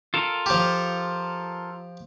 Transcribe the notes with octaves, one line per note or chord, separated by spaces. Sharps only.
F4 A4 A#4
F3 G4